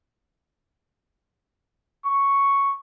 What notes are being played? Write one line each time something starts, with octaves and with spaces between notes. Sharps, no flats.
C#6